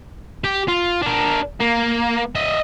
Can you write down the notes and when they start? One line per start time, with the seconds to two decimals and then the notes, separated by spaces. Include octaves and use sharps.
0.44 G4
0.68 F4
1.02 D4 A#4
1.60 A#3
2.35 D#5 E5